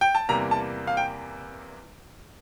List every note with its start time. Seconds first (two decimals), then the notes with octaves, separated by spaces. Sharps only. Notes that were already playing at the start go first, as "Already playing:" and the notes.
0.01 G5
0.15 A5
0.29 E2 C3 G3 A#3 A#5
0.51 A5
0.87 F5
0.97 G5